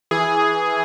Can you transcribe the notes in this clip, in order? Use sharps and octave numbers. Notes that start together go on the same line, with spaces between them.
E3 G#4